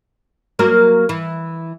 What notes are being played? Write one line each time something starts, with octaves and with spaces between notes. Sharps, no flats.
F#3 A#3 A#4
E3